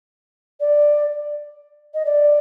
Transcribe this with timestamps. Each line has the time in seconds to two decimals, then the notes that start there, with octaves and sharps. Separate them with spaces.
0.60 D5
1.94 D#5
2.05 D5